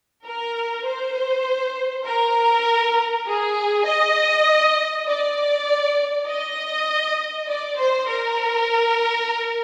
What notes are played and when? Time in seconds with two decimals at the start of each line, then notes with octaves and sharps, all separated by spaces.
0.25 A#4
0.85 C5
2.06 A#4
3.27 G#4
3.86 D#5
5.07 D5
6.27 D#5
7.49 D5
7.79 C5
8.09 A#4